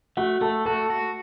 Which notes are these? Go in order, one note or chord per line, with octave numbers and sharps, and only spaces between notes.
A3 F#4 F#5
A3 A4 A5
F#4 A4 A5
F#4